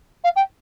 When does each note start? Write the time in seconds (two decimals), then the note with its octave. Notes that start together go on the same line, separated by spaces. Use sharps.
0.24 F5
0.36 G5